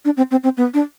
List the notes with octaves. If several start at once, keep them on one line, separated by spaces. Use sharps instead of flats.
D4
C4
C4
C4
B3
D4